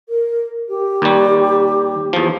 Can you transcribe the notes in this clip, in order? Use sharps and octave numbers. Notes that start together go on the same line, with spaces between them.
A#4
G4
D#2 G3
E2 F3